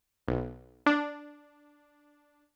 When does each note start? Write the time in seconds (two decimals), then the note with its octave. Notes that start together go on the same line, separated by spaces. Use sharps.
0.28 B1
0.86 D4